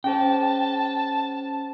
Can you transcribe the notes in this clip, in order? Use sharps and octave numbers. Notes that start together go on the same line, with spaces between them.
C#4 G#4 C5 G5 A5